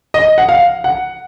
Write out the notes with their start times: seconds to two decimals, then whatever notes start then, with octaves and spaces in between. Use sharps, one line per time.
0.14 D#5
0.38 F#5
0.49 F5
0.84 F#5